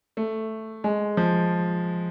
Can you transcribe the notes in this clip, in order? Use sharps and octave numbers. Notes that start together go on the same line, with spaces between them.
A3
G#3
F3